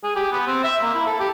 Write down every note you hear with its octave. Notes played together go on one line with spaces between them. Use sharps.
G#4
G4
B3
C4
E5
A#3
E4
A4
G4